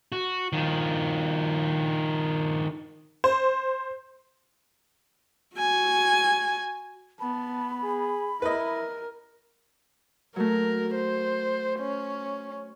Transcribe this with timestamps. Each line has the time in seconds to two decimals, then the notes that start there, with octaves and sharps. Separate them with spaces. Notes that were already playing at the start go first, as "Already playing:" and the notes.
0.12 F#4
0.53 D#3 F3
3.24 C5
5.57 F#4 G#5
7.20 B3 A5 B5
7.83 G#4
8.42 E4 A#4 B4 D#5
10.36 F#3 A3 A#4
10.95 C5
11.79 C#4